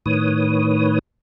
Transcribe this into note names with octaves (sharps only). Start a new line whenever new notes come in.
A2 D#3 B4 C#5 D#6